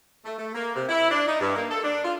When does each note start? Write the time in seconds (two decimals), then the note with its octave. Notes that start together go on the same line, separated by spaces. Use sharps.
0.25 A3
0.38 A3
0.55 A#3
0.75 C3
0.89 E4
1.11 D4
1.28 D#4
1.40 G2
1.56 A#3
1.71 A4
1.84 D4
2.05 F4